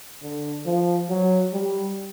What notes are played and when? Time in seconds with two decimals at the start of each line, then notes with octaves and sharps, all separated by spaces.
0.23 D3
0.66 F3
1.10 F#3
1.53 G3